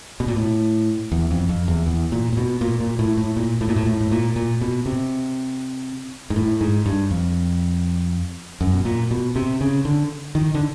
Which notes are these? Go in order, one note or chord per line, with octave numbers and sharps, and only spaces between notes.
B2
A#2
A2
E2
F2
F2
E2
E2
A#2
A#2
B2
A#2
A#2
A2
A2
A#2
A2
A#2
A2
A2
A2
A#2
A#2
B2
C3
G#2
A2
G#2
G2
F2
F#2
B2
A#2
B2
C3
C#3
D3
D#3
D3